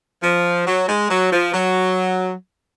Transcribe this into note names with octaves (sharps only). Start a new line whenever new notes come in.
F3
F#3
G#3
F#3
F3
F#3